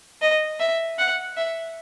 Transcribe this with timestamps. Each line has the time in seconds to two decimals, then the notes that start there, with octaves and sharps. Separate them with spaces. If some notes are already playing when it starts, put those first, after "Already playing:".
0.22 D#5
0.60 E5
0.98 F#5
1.37 E5